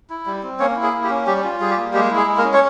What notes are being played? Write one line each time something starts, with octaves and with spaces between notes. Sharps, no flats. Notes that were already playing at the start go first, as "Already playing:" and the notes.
E4
G3
C4
A#3 C#4 C#5
E4
G#4
A#3
G4
C#4
G3 G4
F4
G3 G#4
G4
A#3
G#3 G4
E4
G#4
G#3
A#3 A#4
C#4
C#5